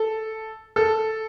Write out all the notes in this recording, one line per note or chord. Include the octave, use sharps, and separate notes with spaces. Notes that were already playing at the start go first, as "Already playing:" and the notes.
Already playing: A4
A4